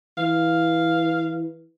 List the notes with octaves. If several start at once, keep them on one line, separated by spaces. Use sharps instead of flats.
E3 F5